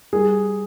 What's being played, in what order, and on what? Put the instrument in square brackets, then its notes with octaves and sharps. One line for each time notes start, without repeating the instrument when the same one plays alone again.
[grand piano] G3 G#4